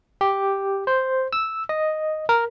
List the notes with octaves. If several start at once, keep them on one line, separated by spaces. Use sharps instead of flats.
G4
C5
E6
D#5
A#4